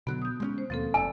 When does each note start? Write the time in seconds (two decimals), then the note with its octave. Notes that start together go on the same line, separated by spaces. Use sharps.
0.07 B2 D3 F#3 B3 F#6
0.22 D#6 G6
0.40 G#3 A#3 C#4
0.58 C5
0.70 D#2 B2 F3 A#3 C4 A4
0.94 F1 D5 G#5 E6